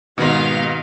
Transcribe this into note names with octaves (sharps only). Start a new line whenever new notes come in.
G#2 B2 D#3 G#3 B3 F5